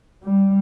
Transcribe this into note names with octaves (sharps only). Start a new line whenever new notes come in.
G3